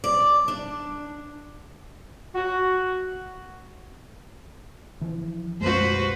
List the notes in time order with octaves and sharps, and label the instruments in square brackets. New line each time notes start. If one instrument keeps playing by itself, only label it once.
[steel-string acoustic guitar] D5
D4
[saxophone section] F#4
[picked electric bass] E3 F3
[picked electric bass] B1 F#2 G#3 [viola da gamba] F#4 B4 C5